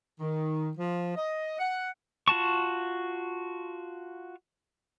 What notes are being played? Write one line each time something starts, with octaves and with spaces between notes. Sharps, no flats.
D#3
F3
D#5
F#5
F4 F#4 A5 C#6